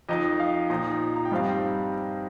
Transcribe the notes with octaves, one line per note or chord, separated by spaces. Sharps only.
F2 F3 D#4 D#5
F5
A#2 F3 D#4 A#5
A#5
G5
G2 G3 C4 D#4 F5
G5